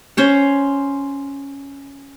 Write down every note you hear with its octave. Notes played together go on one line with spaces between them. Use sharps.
C#4 C5 C#5